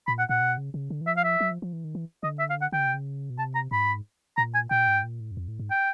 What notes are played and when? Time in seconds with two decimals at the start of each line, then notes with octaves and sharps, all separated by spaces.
0.07 A#2 B5
0.19 F#5
0.29 A#2 F#5
0.41 B2
0.58 C#3
0.74 C#3
0.90 D3
1.01 E3
1.07 F3 E5
1.17 F5
1.24 E5
1.40 F#3
1.51 F3
1.62 F3
1.73 E3
1.84 D#3
1.95 E3
2.23 D3 D#5
2.39 E5
2.50 F5
2.61 F#5
2.72 D3 G5
2.79 C#3
2.86 C3
2.94 C#3
3.30 B2
3.38 C3 A5
3.55 A#5
3.71 G#2 B5
4.37 A#2 A#5
4.55 G#5
4.70 A#2 G5
4.88 G#2
5.03 A#2
5.20 A2
5.31 F#2
5.37 F2
5.48 A2
5.60 G#2
5.71 G5